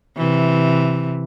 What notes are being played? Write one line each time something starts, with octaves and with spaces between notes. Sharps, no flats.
C3 E3